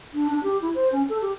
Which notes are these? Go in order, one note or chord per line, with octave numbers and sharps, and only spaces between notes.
D4
D4
G4
E4
C5
C#4
A4
G4